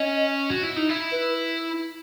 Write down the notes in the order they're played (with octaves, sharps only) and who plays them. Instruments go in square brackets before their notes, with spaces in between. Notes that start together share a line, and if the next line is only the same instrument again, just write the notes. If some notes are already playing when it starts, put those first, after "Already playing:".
Already playing: [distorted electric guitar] C#4 [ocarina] D#5
[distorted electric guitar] F#4
E4
D#4
E4
[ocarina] B4